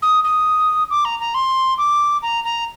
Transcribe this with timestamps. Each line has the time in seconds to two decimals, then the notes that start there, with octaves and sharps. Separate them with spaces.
0.02 D#6
0.24 D#6
0.91 D6
1.05 A#5
1.20 A#5
1.34 C6
1.78 D6
2.22 A#5
2.44 A#5